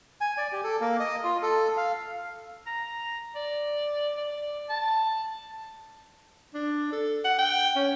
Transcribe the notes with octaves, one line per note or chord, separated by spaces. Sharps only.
G#5
D5
G4
A4
A#3
D#5
F4
A4
F5
A#5
D5
D5
A5
D4
A4
F#5
G5
C#4